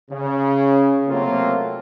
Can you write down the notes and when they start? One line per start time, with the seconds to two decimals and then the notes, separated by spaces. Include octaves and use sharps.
0.11 C#3
1.07 C3 F#3 A3 A#3 C4 F4